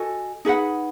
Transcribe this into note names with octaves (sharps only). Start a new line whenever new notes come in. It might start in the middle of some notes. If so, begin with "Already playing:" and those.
Already playing: F#4 A4 D#5 G#5
D#4 G#4 B4 F#5